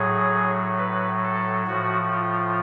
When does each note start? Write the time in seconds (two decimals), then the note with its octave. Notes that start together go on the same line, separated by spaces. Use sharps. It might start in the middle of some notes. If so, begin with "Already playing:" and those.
Already playing: A2 F#3 G#4
0.78 B4
1.23 A4
1.67 A2 F3 F#4
2.12 F4